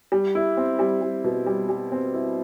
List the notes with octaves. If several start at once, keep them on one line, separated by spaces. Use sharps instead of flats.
G3
E4
C4
G3
G3
B2
G3
G3
C4
E4